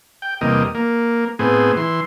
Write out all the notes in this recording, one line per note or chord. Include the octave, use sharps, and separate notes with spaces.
G5
E2 C3 G3 A#3 D#5
A#3
A2 B3 C4 G#4
E3 C6